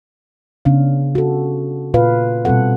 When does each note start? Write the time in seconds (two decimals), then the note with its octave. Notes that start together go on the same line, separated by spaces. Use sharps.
0.65 C#3 B3 C#4 D4 F5
1.15 F#4 A4
1.94 A#2 F4 B4 F5
2.45 B2 G3 C4 A4 F#5